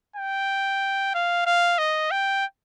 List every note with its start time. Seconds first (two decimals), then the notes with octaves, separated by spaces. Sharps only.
0.16 G5
1.14 F5
1.46 F5
1.78 D#5
2.11 G5